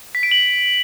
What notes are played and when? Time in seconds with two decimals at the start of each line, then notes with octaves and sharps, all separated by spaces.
0.15 B6
0.23 D7
0.31 F#7